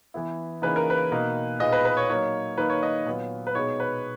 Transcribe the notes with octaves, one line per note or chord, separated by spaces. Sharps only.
E3 B3 E4
C#3 E3 A#3 D#4 B4
A#4
B4
B2 A#3 D#4
A#2 G#3 B3 D#4 D#5
B4
B4
C#5
F#3 A#3 D#4 C#5
D#3 A#3 D#4 B4
C#5
D#5
A#2 F#3 B3
B4
B2 G#3 B3 D#4 C#5
B4